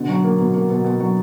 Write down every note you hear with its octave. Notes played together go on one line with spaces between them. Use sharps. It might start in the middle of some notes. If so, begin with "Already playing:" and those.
Already playing: B2 D3
F#3
A#3
B2
A#3
B2
B2
F#3